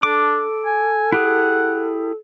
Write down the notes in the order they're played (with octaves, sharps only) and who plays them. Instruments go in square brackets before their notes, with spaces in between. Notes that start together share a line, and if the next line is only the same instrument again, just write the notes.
[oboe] D4 [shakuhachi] A4 [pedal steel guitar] D6
[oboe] G#5
[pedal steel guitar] E4 G4 G#4 [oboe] F#5